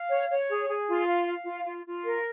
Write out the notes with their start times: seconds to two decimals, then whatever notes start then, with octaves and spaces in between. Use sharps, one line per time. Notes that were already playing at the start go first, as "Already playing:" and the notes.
Already playing: F5
0.10 C#5
0.30 C#5
0.49 G#4
0.69 G#4
0.88 F4
1.07 F5
1.27 F5
1.46 F4
1.65 F4
1.85 F4
2.04 A#4